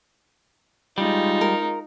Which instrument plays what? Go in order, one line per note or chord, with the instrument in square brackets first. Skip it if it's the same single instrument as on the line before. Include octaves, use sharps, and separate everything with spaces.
[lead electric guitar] G3 [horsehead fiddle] G#3 F4 [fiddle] D#4
[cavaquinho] A#4